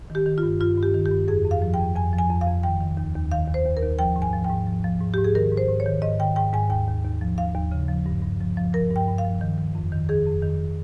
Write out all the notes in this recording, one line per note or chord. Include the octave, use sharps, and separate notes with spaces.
D#3
G4
D#3
F4
G2
G2 F4
G2 G4
D#3
G4
G2
F2 G#4
F2
F5
F3
G5
F2
F2 G#5
F3
G#5
F2
F5
F2
D#3 G5
D#3
D#2
D#2
D#3 F5
D#2
C5
D#2
A#4
D#2
F3 G5
G#2
G#5
F3
G5
G#2
F3
F3
G#2
G#2 G4
G#4
D#3 A#4
G#2
C5
G#2
C#5
D#3
G#2 D#5
D#3 G5
G#2 G5
G#2 G#5
D#2 G5
D#2
D#2
F3
D#2 F5
D#2
C#3
F3
G2
G2
F3
F3
F3 A#4
G2
G5
G2
F5
F3
D#3
D#3
F2
D#3
D#3 G#4
F2
D#3